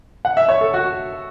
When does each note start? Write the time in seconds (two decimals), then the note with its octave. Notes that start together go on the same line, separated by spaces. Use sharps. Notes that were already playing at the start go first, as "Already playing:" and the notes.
0.25 F#5
0.37 E5
0.49 C#5
0.61 A4
0.74 F#4